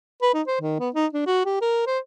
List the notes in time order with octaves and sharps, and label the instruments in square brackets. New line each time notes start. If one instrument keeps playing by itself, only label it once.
[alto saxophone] B4
D#4
C5
D#3
B3
D#4
D4
F#4
G4
A#4
C5